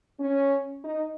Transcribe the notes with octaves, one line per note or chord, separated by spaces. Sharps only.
C#4
D#4